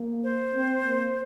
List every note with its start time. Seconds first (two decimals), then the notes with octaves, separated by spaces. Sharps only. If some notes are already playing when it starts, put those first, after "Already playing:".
Already playing: A#3
0.24 C5
0.55 C4
0.85 A#3